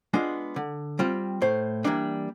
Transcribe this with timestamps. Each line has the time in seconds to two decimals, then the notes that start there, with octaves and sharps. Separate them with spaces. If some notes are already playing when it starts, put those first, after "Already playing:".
0.14 G#3 B3 D4 F4
0.56 D3
0.99 G3 C4 F4
1.42 A2 C5
1.85 E3 G3 A#3 D4